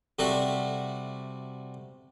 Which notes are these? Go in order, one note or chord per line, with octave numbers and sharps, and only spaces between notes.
C3 G3 A3 F#4